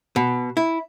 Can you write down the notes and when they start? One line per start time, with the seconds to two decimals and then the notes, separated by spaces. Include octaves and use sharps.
0.16 B2
0.57 E4